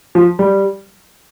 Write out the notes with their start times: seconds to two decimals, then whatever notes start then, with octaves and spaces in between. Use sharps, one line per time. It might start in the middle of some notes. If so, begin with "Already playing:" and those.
0.15 F3
0.39 G3